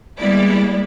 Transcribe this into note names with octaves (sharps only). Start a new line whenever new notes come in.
G3 G#3 A#3 B3 E4 D5